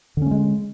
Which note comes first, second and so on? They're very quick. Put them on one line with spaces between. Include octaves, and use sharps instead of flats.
D3 C#4 A3 G#3